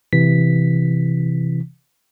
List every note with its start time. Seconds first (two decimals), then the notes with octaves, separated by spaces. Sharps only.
0.13 C3 E3 B6